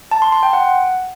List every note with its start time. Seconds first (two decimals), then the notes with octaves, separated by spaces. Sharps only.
0.11 A5
0.22 C6
0.32 C6
0.43 G5
0.53 F#5